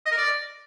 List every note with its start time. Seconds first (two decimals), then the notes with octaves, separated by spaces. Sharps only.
0.06 D#5
0.11 A#4
0.17 D5